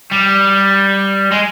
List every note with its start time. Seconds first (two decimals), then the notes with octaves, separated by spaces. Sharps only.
0.11 G3
1.31 G#3